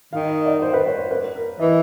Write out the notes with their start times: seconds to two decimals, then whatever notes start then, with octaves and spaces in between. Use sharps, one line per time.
0.13 D#3 F5
0.29 D#5
0.46 D5
0.62 C5
0.74 B4
0.86 C#5
0.99 C5
1.11 B4
1.35 A#4
1.60 E3 D#5